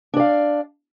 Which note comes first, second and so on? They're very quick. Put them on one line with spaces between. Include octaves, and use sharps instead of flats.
D4 D5 F5